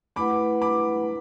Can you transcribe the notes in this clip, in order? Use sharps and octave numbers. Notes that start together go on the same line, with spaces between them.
A3 E4 B4 F#5 B5 D6
B5 D6